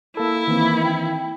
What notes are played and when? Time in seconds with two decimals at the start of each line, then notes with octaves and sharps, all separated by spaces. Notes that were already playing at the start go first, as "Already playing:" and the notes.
0.17 A#3 E4 A4
0.47 D#3 E3 A#3 C4
0.84 G5